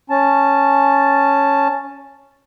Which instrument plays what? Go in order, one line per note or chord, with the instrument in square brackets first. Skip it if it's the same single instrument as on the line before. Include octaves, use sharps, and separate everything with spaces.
[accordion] C#4 A5